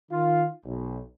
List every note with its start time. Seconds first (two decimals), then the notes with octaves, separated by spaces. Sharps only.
0.11 D#3 F4
0.65 B1